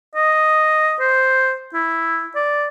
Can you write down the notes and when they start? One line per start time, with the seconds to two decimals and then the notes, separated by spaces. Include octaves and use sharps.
0.15 D#5
1.00 C5
1.74 E4
2.35 D5